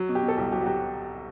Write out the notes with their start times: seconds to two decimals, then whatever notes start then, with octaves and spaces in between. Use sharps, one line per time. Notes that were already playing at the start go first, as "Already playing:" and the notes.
Already playing: F#3
0.09 B2
0.15 G4
0.22 B2
0.28 A4
0.37 C2 G4
0.52 F#3 G4
0.62 F#4
0.66 F#3 G4